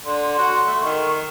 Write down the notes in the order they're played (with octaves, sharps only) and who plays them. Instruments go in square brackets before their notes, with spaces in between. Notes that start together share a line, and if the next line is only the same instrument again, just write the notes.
[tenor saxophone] D3 [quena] C6
[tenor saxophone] F#4
A3
[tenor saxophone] D#3 [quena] C#6